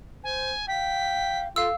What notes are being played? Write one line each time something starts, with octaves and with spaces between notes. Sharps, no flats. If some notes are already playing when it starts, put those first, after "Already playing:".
C5 G#5
F5 G5 B6
F4 A4 F5 E6